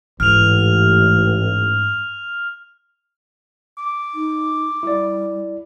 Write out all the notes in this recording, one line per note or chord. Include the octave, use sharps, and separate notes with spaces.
A1 G#2 F6 F7
D6
D#4
G3 E4 D5